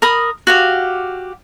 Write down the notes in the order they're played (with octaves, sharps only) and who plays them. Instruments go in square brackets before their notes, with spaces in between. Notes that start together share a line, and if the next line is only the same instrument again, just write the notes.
[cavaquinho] A#4 B5 D#6
F#4 G4 F5